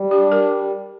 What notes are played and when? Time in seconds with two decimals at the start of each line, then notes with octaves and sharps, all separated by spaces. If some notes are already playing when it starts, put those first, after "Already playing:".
Already playing: G3
0.11 D4 G4
0.31 G3 A#4